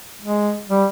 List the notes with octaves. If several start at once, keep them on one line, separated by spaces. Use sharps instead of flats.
G#3
G3